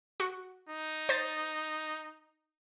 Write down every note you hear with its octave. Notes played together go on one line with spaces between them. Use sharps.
F#4
D#4
C5 A6